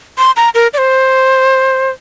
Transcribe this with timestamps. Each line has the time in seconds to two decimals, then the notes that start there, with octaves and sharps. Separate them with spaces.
0.18 C6
0.37 A#5
0.55 A#4
0.73 D5
0.78 C5